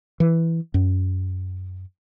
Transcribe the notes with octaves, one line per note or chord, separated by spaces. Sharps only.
E3
F#2